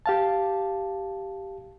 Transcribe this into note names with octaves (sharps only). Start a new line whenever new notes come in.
G4 F5 A5